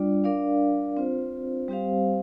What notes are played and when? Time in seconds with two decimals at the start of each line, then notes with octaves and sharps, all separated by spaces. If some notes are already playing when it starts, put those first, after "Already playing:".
Already playing: G3 D4 F4 D5
0.24 D4 A#4 D5 F5
0.97 C4 F4 C5
1.68 G3 C4 G4 C5 F5